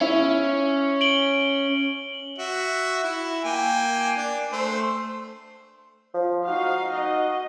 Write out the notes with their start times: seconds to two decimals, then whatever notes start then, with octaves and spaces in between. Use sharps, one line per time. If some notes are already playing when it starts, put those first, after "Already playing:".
0.01 C#4 E4
1.01 D7 F#7 G7
2.39 F#4 E5
3.04 E4
3.44 A#3 G5 G#5
4.17 D4
4.52 A3 C5
6.14 F3
6.48 D#4 F#4 F5
6.96 D#5